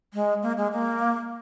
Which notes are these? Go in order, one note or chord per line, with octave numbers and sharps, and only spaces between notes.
G#3
A#3
G#3
A#3